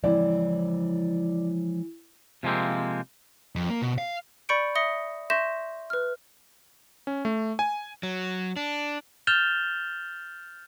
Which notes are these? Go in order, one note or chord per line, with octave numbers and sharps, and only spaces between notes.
E3 F3 G#3 C4 E4 D5
C3 F3 G#3 A#3 C4
F2
A#3
B2
F5
D5 B5 C#6 G6 C#7 D7
E5 D#6 A#6 C#7 G7
E5 C6 C#6 G6 A#6 E7
B4 F6
C#4
A3
G#5
F#3
D4
F6 G6 A6 E7 F7 G7